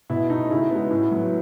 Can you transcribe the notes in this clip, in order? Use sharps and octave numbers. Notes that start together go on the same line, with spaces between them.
B2 E4
A3 D#4
C#3 E4
G#3 B3
A2
F#3 B3